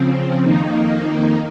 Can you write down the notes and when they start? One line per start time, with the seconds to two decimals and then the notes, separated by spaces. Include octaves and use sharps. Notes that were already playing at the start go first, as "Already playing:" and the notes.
Already playing: C#3 F3 C4
0.43 F2 D#3 A#3 D#4